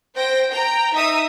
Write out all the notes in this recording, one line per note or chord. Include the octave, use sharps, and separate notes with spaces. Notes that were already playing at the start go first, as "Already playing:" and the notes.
C5 G5 A#6
G5 A#5
D#4 E5 D#6 E6